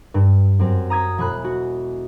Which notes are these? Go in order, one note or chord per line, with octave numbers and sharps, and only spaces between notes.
G2
F#2 C4
A#5 D#6 G#6 B6
E1 G#4 B5 F#6
F#4